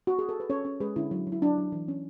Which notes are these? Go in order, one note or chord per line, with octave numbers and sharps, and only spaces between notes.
F#4
G#4
A4
B4
C#4 A4 C#5
C#4
G#3 G#4 B4
D3 C#4 E4
F#3
F#3
E4
F#3 D4
F#3
E3
C#4